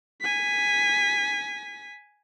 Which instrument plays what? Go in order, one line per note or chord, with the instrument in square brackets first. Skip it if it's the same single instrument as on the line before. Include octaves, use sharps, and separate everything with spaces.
[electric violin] G#5 B6